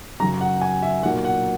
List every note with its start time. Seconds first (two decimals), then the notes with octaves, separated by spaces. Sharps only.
0.20 F#2 C#3 F#3 A#5
0.41 F#5
0.62 G#5
0.83 E5
1.03 B1 A#2 F#3 A#3 F#5
1.25 F#5